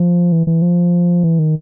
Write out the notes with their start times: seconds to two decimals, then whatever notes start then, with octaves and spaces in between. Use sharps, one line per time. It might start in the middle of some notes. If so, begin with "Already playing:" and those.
Already playing: F3
0.32 E3
0.47 E3
0.62 F3
1.23 E3
1.39 D#3